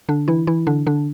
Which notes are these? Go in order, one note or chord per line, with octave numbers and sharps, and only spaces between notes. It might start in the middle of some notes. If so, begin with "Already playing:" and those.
D3 D4
E3 E4
E3 E4
D3 D4
D3 D4